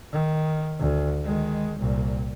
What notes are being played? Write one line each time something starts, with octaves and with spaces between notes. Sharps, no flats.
D#3
D2
D#3 G#3
C2 A#2